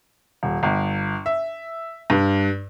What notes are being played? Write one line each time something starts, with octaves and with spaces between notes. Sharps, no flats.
D#1
G1
E5
G2